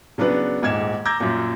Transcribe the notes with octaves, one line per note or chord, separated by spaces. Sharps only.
C#3 F#3 B3 D4 B4
D#1 G#2 D6 G#6 E7
A#5 D6 E6 G6 G#6 A#6
F#2 A#2